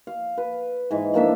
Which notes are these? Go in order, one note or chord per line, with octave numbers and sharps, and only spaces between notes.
F5
B4
G#2 E3
F3 A#3 D4 E5